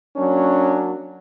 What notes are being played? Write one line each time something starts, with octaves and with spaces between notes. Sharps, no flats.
F#3 A#3 C#4 D4